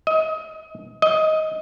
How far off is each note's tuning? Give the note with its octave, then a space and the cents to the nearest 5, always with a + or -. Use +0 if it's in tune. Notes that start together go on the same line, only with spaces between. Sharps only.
D#5 +30
D#5 +15